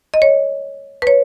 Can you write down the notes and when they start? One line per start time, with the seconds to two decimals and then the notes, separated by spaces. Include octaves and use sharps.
0.14 D#5
0.22 C#5
1.02 B4
1.07 C#5